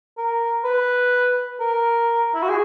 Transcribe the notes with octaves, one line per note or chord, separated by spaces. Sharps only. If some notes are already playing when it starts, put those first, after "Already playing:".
A#4
B4
A#4
E4
F#4
G#4